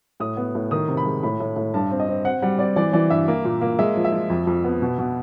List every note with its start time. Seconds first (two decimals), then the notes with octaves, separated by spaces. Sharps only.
0.20 A2 D#6
0.37 B3
0.55 A2
0.71 D#3 D#6
0.88 C3
0.97 B5
1.06 G#3
1.23 A2 B5
1.40 A2
1.56 A2
1.74 G2 A5
1.91 C4
2.00 D#5
2.08 C4
2.25 C4 F#5
2.42 G3 F#5
2.59 C4 D5
2.76 E3 D5
2.93 E3 D5
3.10 G2 E5
3.28 A#3
3.45 A#2
3.61 A#3
3.79 G#3 E5
3.96 F3
4.05 E5
4.12 F3
4.30 F2
4.47 F2
4.64 B3
4.82 B2
4.98 B2